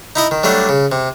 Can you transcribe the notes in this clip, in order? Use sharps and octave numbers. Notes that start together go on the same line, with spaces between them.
D#4 E4 D#5
D#3
F#3 G3 A3 D4
C#3
C3